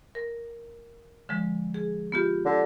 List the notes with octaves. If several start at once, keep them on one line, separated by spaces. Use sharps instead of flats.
A#4
D3 F3 G#3
G#4
B3 F4 G4
D3